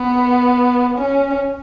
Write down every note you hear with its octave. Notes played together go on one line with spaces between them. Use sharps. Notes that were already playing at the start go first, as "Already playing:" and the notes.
Already playing: B3
C#4